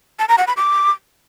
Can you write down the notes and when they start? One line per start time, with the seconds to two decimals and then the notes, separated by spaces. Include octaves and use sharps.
0.19 A5
0.29 A#5
0.38 F#5
0.47 B5
0.57 D6